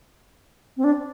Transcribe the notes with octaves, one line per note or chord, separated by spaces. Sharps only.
C4
D4